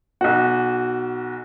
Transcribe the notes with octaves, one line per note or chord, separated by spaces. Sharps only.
B1 F#4